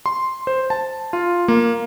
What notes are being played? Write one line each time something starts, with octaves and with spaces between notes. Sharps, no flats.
C6
C5
A5
F4
A#3